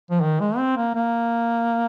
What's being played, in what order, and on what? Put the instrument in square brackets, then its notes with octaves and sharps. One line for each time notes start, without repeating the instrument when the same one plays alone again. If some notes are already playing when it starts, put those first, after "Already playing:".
[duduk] F3
D#3
G#3
C4
A#3
A#3